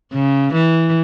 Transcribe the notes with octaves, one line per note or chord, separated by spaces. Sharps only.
C#3
E3